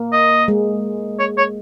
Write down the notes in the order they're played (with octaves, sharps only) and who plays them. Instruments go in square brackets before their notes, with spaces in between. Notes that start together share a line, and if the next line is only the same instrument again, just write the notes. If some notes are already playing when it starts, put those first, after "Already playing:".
Already playing: [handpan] A#3
[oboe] D#5
[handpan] G#3
[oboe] C#5
C#5